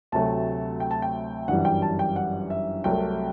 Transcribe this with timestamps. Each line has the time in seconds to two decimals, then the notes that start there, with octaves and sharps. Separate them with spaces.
0.12 D2 C3 F#3 A3 A5
0.80 G5
0.91 A5
1.02 G5
1.48 G1 F#2 E3 G3 F#5
1.65 G5
1.82 A5
1.99 G5
2.16 F#5
2.50 E5
2.84 C2 C3 F#3 A3 G5